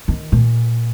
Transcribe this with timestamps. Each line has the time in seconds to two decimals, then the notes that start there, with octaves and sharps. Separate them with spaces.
0.08 D#3
0.32 A#2